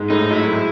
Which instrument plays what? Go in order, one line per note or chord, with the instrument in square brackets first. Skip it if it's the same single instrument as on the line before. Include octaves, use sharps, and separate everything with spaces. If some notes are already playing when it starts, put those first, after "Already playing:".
Already playing: [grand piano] G#2 G#3
[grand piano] A2 A3 [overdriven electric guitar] D#4
[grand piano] F#3 [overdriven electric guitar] E4
[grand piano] A3
G#3